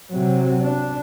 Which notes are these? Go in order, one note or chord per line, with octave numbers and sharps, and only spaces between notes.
C3 F#3
D4